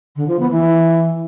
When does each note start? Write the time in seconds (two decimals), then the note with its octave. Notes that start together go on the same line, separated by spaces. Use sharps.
0.16 D3
0.28 F3
0.39 B3
0.51 E3